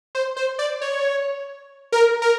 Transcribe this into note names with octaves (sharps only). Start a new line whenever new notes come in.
C5
C5
D5
C#5
A#4
A#4